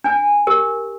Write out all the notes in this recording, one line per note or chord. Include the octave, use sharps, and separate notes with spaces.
D4 G#5
G4 A#4